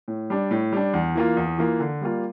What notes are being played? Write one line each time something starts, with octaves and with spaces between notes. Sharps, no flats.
A2
G3 D4
A2
G3 D4
E2
E3 A#3 F4
E2
E3 A#3 F4
D3
G3 A#3 F4